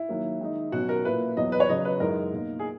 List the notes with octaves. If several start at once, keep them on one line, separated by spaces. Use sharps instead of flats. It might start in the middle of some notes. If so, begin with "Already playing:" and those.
Already playing: E4
D#3 F#3 A#3
D#3 G#3 D#4
B2 F#3 C#4 F#4
A#4
A#2 A#3 E4 B4
E2 B2 F#3 B3 D#5
B4
C#5
C#3 F#3 C#4 D#5
B4
F#2 E3 G#3 D#4 A#4
B2 A#3 D#4
G#4